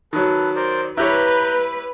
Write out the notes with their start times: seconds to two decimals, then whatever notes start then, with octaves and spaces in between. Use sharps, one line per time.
0.13 D#3 F#3 A4 B4
0.56 A#4 C5 D5
0.97 E4 G4 B4 C#5 A#5 F#6 G6